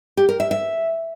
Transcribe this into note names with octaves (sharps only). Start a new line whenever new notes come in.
G4
A#4
E5
E5